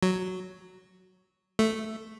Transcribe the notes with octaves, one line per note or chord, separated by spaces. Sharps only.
F#3
A3